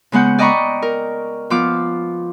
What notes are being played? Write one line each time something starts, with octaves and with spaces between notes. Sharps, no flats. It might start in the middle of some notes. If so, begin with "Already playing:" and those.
C#3 G#3 B3 F#5 G6
D5 D#5 G5 A#5 B5 C#6
A#4
F3 B3 D6 F6